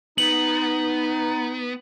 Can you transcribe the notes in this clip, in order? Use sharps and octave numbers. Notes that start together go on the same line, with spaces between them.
B3 D#4 F#7